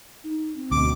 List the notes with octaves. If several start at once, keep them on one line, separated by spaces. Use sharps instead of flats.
D#4
C4
D2 B2 D6